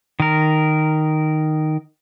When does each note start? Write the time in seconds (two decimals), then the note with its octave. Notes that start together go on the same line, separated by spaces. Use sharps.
0.20 D#3 A#4